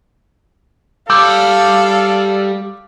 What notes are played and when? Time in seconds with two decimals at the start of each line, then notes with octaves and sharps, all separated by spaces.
1.10 G3 A4 F5 D6 E6 G6